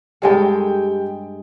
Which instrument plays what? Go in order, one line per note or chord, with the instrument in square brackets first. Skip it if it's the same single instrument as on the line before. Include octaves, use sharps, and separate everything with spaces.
[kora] G2 G#3 A4 [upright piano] G4 D#5 G5